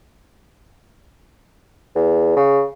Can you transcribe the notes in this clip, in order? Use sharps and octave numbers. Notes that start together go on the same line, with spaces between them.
E2
C#3